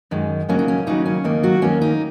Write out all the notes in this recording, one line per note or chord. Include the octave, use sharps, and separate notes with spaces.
F#2 D#3 G#3
D#2 C#3 F#3 A#3 C#4
D#4
C#4
D#2 C#3 F#3 A#3 D#4
C#4
D#2 D#3 A#3
F#3 F#4
D#2 D#3 A#3 C#4
D#4